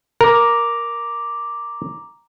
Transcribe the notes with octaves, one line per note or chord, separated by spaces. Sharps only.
A#4 A#5 D6